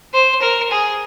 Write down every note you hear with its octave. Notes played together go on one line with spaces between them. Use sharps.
C5
A#4
G#4